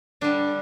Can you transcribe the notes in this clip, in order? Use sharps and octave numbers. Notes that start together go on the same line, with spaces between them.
D3 G3 D4